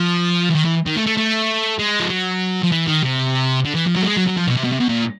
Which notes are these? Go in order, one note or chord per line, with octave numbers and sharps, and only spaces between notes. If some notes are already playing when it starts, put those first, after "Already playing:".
Already playing: F3
E3
D#3
E3
D#3
A3
A3
A3
G#3
F3
F#3
F3
E3
D#3
C3
D3
E3
F3
F#3
A3
G#3
F#3
F#3
F3
B2
C3
B2
C3
B2
A#2